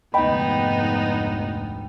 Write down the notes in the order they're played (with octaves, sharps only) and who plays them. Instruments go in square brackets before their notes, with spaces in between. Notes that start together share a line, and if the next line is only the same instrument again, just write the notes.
[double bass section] F1 D2 G#2 [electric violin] B3 D#4 [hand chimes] D#5 [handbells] G5 B5